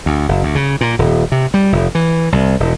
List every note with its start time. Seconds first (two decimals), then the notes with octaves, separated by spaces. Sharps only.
0.06 D2
0.28 F#1
0.43 D2
0.55 C#3
0.81 A#2
0.99 D#1
1.32 C3
1.54 G3
1.72 F1
1.95 E3
2.32 C2
2.60 E1